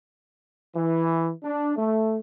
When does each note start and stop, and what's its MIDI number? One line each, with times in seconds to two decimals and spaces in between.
0.75 1.29 52
1.43 1.73 62
1.76 2.16 57